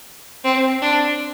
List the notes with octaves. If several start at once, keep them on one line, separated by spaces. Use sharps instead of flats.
C4
D4